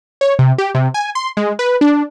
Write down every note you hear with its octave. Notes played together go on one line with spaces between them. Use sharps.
C#5
C3
G4
C3
G#5
C6
G#3
B4
D4